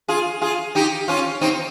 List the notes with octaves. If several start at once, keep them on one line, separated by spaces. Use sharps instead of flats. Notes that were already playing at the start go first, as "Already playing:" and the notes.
F4 G#4
F4 G#4
D#4 G4
C#4 F4
C4 D#4